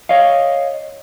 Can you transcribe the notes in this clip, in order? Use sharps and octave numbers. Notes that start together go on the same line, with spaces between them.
C#5 D#5 F5